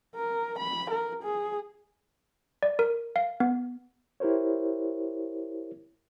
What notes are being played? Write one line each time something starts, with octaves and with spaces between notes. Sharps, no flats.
A#4
B5
A#4
G#4
D5
A#4
F5
B3
E4 G4 A#4 C5 C#5